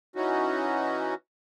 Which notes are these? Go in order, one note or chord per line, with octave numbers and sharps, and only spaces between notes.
E3 C#4 D#4 F#4